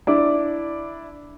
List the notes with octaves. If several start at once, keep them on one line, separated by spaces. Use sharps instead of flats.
D4 E4 D5